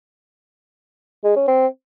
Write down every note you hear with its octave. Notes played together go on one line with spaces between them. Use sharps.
G#3
C#4
C4